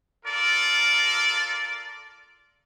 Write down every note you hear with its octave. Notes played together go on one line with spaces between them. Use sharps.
F4 A4 A#4 D5